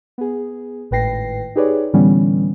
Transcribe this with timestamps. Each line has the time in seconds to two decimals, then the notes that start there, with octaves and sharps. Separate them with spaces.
0.18 B3 G#4
0.91 G#1 A2 B4 G5 A#6 C7
1.55 D#4 G4 G#4 B4 C#5 D5
1.93 A2 D3 E3 G3 B3 C#4